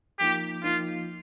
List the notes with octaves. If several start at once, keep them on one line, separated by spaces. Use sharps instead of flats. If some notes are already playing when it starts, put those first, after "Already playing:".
F3 A#3 D#4 G4
F3 A#3 D#4 F4